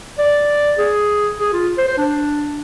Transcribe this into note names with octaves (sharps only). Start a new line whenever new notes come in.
D5
G#4
G#4
F4
C5
C5
D4